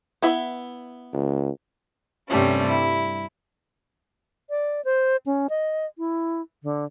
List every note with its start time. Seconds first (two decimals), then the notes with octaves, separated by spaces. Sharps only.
0.22 B3 E4 E5
1.13 C#2
2.28 G2 C3 G3 A3 C#4
2.68 E4
4.50 D5
4.85 C5
5.26 C#4
5.50 D#5
5.98 E4
6.63 D3